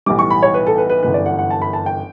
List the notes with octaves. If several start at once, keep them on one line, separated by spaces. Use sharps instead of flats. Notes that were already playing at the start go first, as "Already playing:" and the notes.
B1 A2 E3 G3 D6
C#6
B5
C#5
B4
A4
B4
B4
G1 F#2 E3 B4
D5
F#5
F#5
A5
B5
A5
G5